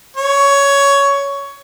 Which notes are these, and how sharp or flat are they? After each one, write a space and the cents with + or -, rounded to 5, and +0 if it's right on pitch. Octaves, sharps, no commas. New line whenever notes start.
C#5 +15